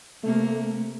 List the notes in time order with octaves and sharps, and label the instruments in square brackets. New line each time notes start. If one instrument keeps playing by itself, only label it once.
[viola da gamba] C3 A#3 [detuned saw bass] A3